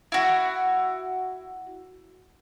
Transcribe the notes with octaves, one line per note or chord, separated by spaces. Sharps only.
E4 F#4